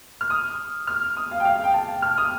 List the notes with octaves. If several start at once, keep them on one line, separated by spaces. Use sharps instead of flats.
F6
D#6
F6
D#6
F5
G5
F5
F5
G5
A5
F6
D#6